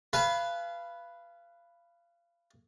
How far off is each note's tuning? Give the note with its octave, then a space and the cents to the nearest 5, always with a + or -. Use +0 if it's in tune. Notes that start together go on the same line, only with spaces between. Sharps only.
B4 +0 F5 -25 G#5 +45